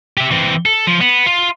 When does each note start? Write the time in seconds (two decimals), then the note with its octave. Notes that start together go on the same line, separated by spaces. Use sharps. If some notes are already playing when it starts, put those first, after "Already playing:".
0.17 G4 E5
0.31 E3 C4
0.66 A4
0.87 F3
1.01 B3
1.26 F4